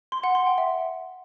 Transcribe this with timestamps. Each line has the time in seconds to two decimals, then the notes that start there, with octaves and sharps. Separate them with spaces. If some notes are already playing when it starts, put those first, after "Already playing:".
0.12 C6
0.24 F#5
0.35 C6
0.46 G5
0.58 E5